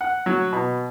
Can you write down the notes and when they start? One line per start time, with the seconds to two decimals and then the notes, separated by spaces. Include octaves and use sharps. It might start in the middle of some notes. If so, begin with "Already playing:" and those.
0.01 F#5
0.26 F#3
0.53 B2